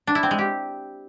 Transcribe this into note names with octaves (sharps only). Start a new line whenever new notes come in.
D4
E4
C4
G#3
G4